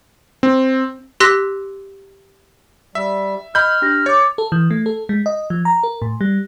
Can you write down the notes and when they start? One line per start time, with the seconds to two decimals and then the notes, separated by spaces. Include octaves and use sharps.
0.43 C4
1.20 G4 C6 E6 F#6 A#6 B6
2.95 G3 E5
3.55 D#5 B5 F6 G6
3.82 D4 G4 A#6
4.06 C#5 D6 A6
4.38 A4
4.52 E3
4.70 A3
4.86 A4
5.09 G#3
5.26 D#5
5.50 F3
5.65 A#5
5.83 A#4
6.02 A2
6.21 G3